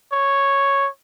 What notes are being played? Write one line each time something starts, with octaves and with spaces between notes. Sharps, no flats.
C#5